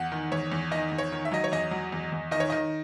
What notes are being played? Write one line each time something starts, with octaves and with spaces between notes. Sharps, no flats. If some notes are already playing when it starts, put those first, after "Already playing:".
Already playing: E2 F#5
D#3
E2 C#5
E2
D#3 D#5
E2
C#5
D#3
E5
F#3 D#5
C#5
E2 D#5
F#3
E2
E2
D#3 D#5
C#5
D#3 D#5